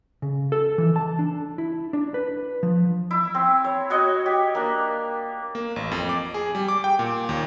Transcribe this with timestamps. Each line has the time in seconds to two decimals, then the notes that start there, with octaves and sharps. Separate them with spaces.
0.22 C#3
0.52 A4
0.78 E3
0.96 A5
1.19 D4
1.58 E4
1.93 D4
2.14 B4
2.63 F3
3.11 E4
3.34 C4
3.64 C#5
3.90 F#4 C#5 D#5
4.26 G4
4.55 A#3 D4
5.55 A#3
5.76 A1
5.91 F2
6.09 D6
6.34 G#4
6.55 G3
6.68 D6
6.84 G5
6.99 A#2
7.29 D#2